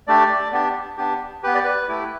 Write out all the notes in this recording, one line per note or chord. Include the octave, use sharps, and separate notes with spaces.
A3 D4 G4 D5
B3 D4 G4
B3 D4 G4
B3 G4 B4
D5
B4
A3 E4 G4